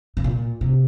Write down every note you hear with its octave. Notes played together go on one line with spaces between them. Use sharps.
C3
A#2
C3